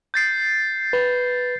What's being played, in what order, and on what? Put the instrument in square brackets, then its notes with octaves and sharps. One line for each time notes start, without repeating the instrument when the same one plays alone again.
[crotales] G6 A6 C7
[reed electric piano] B4